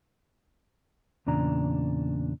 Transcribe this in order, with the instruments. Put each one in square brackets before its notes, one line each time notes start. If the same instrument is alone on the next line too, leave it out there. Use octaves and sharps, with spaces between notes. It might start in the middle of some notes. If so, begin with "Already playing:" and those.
[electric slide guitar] E2 A#2 C#3 D4 A#5